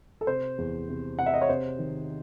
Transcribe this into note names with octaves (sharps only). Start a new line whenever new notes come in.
A4
C3 C5
E2
C3
C3 F#5
E5
D#5
C#5
C3 C5
D#3